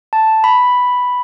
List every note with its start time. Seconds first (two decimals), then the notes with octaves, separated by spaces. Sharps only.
0.13 A5
0.44 B5